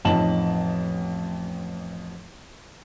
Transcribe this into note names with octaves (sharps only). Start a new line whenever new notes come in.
A1 F2 D#4 A5 E7 F#7